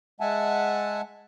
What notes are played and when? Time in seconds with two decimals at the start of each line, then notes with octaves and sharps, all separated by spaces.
0.20 G#3 E5 F#5 G#5 A5